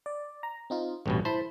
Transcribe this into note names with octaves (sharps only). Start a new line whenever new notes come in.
D5
A#5
C4 D#4 F4
A1 G2 B2 G3
E4 C5 A5 B5